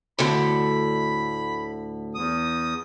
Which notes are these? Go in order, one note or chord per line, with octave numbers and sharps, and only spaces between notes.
D2 A2 D3 B5
E2 D#6